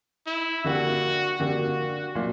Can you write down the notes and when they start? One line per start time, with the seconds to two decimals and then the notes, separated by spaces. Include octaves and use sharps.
0.27 E4
0.64 D3 A#3 D4 F#4 G4
1.40 D3 A#3 D4 F#4 G4
2.15 A#2 F#3 A#3 D4